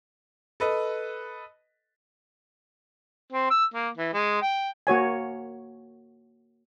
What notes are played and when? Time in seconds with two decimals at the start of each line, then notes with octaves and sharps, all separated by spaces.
0.60 A4 B4 D#5
3.32 C4
3.50 E6
3.74 A#3
3.97 E3
4.13 G#3
4.42 G5
4.87 A#3 F#4 C#5 G#5